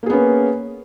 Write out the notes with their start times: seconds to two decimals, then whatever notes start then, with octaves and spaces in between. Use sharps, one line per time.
0.03 A#3
0.06 G#4
0.10 B3
0.13 C#4